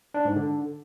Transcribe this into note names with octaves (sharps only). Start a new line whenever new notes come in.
D4
G#2
D3